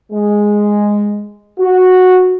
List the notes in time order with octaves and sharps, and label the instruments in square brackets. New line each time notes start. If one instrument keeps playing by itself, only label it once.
[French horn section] G#3
F#4